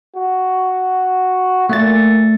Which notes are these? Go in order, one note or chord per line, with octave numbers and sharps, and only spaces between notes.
F#4
A#2 A3 A6